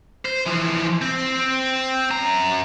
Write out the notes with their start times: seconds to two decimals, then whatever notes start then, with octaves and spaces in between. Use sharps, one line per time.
0.25 C5
0.46 E3 F3
1.02 C4
2.11 F#2 A#5